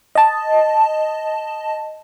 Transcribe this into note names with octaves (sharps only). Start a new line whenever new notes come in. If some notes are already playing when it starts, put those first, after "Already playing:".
D#5 A5